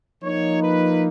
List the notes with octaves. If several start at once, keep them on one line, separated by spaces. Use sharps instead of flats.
F3 A#3 D#4 C#5
B4